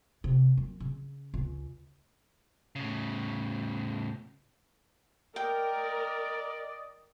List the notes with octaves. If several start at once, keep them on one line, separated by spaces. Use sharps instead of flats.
C3
F#2
C#3
C#2
A2 C#3
A#4 D5 D#5 G5